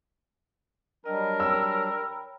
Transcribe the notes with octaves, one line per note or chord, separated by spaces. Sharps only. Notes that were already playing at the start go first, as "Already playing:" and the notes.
F#3 G3 D4 A#4 D#5 G5 E6
C#5 G5 B5 E6